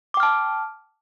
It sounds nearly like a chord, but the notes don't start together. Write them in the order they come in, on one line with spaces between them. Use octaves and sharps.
D6 G5 F6 A5